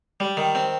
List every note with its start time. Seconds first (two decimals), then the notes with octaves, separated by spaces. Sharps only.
0.20 G3
0.37 D#3
0.55 C4